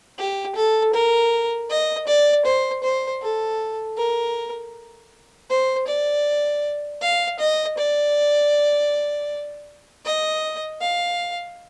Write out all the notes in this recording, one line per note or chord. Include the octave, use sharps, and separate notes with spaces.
G4
A4
A#4
D#5
D5
C5
C5
A4
A#4
C5
D5
F5
D#5
D5
D#5
F5